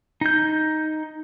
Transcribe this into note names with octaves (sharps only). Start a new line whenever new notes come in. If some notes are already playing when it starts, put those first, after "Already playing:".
D#4 G6